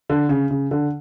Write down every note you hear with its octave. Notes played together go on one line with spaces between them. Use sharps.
D3
C#3
C#3
D3